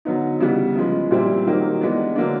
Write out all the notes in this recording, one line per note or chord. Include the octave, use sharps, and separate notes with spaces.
D3 F#3 B3 D#4
C#3 E3 G3 B3
C#3 F3 G#3
A#2 G3 C4 E4
D#3 F#3 A#3 D#4 G4
E3 G#3 B3 D4
D3 F#3 A#3 D4